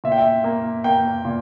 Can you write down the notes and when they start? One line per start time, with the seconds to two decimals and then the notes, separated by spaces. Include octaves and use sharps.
0.04 A#2 E5
0.12 G5
0.20 E5
0.44 A#3
0.84 A#3 G5
1.25 A#2